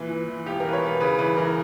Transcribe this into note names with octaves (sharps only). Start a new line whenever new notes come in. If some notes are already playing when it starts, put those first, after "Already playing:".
Already playing: A#2 E3 B4
E3
E3
E1 G4
A#4
E3 B4
C#5
E1
B4
C#3 B4
E3 B4
E3 A#4